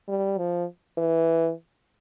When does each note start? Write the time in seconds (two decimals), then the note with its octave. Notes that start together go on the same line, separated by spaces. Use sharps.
0.08 G3
0.38 F3
0.98 E3